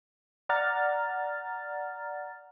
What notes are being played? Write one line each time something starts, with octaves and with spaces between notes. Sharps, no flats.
D5 F#5 A#5 F6 A6